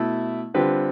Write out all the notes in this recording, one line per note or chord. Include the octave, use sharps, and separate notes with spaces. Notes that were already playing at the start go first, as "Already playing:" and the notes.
Already playing: B2 A3 E4
D3 G3 C4 F4 B4